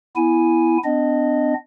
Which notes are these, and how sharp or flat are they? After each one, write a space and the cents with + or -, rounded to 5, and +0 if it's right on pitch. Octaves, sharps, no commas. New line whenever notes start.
B3 +0 E4 +0 G#5 +0
B3 +40 D4 +0 D#5 -15